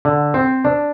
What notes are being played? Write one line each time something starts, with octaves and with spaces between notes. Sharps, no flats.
D3
C4
D4